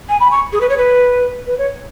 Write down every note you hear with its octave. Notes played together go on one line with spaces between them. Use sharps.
G#5
B5
C#6
G#4
B4
C#5
B4
B4
C#5